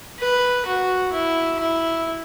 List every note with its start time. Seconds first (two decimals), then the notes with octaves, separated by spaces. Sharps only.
0.19 B4
0.66 F#4
1.12 E4
1.59 E4